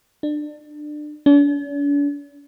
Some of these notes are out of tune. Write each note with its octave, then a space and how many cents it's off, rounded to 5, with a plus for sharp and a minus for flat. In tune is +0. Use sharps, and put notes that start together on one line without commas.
D4 +25
D4 -45